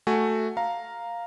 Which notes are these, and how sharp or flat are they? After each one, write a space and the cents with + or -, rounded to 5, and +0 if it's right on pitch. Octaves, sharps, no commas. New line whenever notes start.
A3 +0 F#4 +0 G#5 +0
F5 +0 A#5 +0